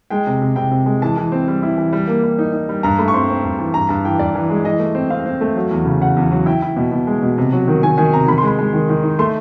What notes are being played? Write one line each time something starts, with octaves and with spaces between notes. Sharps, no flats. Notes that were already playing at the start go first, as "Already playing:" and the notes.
G#3 G5
C3
C3
C3 G5
C3
G#3
E3 A5
E3
C4
G3
E4
E3
G3
A#3
G3
D#4
D#4
G3
G2 A#5
A3 B5
C#6
C4 C6
C4
G2
E3
G2 A#5
G2 A5
E3 G5
G2 D5
E3
G#3
E3 D#5
A3
C4
C4 F5
C4
A3
F#3
E2
C#3
C#3 F#5
E2
F#3
E4 G5
E4
B2
B2
G#3
B2
C3
F#3
D#3
D#3 G#5
D#3 G#5
C3 A#5
D#3 B5
C6
G#3 B5
G#3
D#3
D#3
D#4
A3 C6